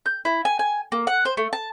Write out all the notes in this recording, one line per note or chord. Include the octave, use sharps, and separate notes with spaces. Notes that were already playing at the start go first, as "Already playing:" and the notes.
G6
E4
G#5
G#5
A#3
F#5
C5
A3
A5